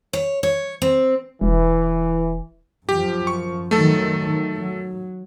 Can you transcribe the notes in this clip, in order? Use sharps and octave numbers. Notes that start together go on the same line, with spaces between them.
C#5
C#5
C4
E1 E3
F#2 F3 G4
C#6
D#3 F#3 A3 A4
F#3